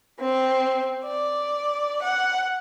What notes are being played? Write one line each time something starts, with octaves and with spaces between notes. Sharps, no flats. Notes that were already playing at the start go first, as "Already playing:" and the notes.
C4
D5
F#5